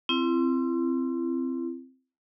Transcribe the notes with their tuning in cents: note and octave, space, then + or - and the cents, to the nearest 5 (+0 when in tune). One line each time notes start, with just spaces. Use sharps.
C4 +0 E4 +35